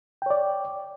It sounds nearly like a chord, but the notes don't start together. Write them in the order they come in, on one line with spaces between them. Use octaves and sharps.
G5 C#5 D5